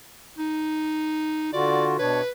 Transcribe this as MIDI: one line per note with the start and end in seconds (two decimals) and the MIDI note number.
0.38 1.53 63
1.53 1.97 50
1.53 1.97 65
1.53 1.97 66
1.53 1.85 74
1.99 2.21 47
1.99 2.21 62
1.99 2.30 71
1.99 2.21 73